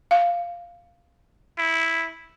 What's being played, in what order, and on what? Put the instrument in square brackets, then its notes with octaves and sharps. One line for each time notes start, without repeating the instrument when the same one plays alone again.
[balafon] F5
[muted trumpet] E4